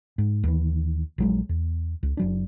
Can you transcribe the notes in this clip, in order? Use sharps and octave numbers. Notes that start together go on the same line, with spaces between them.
G#2
D#2 E3
A#1 F#3 G#3
E2
C#2
F#1 F#3 D4